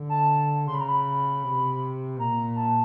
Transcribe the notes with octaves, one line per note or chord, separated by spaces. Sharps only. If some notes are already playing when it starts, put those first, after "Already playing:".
Already playing: D3
A5
C#3 C6
B5
A#5
B5
C3
A#2 A#5
A5